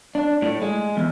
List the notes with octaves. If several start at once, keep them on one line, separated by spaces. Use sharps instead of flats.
D4
A2
G#3
E2